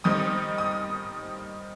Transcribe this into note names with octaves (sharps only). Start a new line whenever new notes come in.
D#3 G3 C4 D#4 D#6
D#6